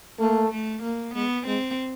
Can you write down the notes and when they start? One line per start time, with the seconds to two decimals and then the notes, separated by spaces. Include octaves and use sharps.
0.19 A3 A#3
0.51 A3
0.83 A#3
1.15 G#3 B3
1.47 G#3 C4